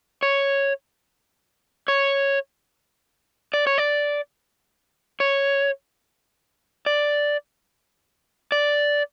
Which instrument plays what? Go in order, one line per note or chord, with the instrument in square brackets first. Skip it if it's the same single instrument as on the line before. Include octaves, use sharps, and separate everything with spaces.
[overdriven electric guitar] C#5
C#5
D5
C#5
D5
C#5
D5
D5